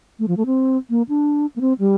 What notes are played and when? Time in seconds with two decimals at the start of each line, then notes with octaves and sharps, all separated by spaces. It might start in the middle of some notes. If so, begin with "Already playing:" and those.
0.19 A3
0.28 F3
0.37 A3
0.46 C4
0.90 A#3
1.09 D4
1.56 A#3
1.61 C4
1.79 G3